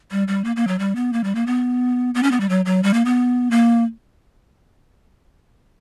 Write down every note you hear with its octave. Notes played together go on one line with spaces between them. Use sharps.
G3
G3
A#3
A#3
F#3
G3
B3
A#3
G3
A#3
B3
B3
C#4
B3
G3
F#3
F#3
G3
A#3
B3
A#3